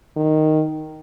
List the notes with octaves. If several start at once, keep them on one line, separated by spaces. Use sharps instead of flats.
D#3